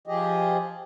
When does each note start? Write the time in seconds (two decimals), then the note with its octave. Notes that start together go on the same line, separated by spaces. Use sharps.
0.07 F3 G4 G#4 D#5